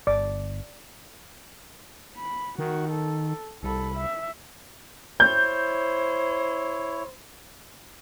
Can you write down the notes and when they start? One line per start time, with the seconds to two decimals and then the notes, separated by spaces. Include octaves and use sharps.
0.07 G1 D5 D6
2.17 B5
2.59 D#3 F#4
2.90 A4
3.63 C2 A4 B5
3.95 E5
5.20 E4 C5 C#5 G6